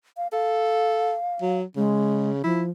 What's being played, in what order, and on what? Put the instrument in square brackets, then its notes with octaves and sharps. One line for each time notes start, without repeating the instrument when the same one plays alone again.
[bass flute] F5
[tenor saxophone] A4 [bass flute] F5
[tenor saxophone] F#3
[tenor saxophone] C#3 [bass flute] G#3
[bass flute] F3 [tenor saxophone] E4